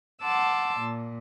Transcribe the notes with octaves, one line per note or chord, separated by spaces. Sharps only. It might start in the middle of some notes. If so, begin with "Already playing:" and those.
F#5 A5 C6 D6 E6
A#2